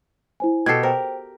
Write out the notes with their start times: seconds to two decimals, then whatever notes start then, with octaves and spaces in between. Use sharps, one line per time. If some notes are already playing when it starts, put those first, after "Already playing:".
0.40 E4 C5 G#5
0.66 B2 G4 A4 G#6 C7
0.83 A#4 C5 G5